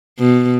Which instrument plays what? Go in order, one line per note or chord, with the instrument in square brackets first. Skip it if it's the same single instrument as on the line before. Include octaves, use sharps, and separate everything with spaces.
[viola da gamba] B2